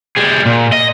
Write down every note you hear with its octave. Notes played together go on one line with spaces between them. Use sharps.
G3 G#4
A#2
D#5